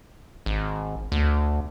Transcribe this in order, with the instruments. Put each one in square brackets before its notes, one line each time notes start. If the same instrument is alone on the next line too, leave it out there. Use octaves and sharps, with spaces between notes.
[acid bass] G#1
D2